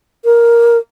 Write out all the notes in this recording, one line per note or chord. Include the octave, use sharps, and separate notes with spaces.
A#4